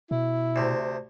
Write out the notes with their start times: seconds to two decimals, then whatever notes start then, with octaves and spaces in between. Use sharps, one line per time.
0.11 B2 E4
0.56 D2 C3